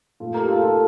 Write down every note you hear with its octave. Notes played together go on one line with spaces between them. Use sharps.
A#2 A3 F4 A4
G4 A#4
F4 A4
F4 A4